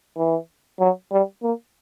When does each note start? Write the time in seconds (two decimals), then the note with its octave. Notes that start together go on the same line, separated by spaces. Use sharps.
0.16 E3
0.80 F#3
1.12 G3
1.43 A#3